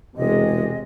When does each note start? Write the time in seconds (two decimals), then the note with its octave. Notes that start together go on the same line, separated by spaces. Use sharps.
0.17 E1 C3 G#3 D#5